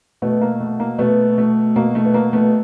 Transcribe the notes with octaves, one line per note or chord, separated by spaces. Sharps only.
B2 A3 B3
A#3
A3
A#3
B2 A3 B3
A3
B2 A#3
A3
B3
A#3
A3 B3